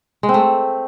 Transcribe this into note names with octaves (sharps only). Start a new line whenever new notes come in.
G#3
C4
A3